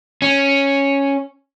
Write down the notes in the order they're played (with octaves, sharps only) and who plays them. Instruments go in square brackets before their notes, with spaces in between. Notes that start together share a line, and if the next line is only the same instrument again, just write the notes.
[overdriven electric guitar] C#4